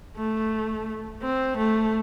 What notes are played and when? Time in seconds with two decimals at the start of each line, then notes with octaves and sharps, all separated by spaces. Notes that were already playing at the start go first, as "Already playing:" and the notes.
0.17 A3
1.22 C4
1.57 A3